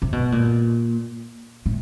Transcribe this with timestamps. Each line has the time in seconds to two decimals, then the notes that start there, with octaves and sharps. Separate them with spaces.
0.02 C3
0.12 B2
0.32 A#2
1.66 A2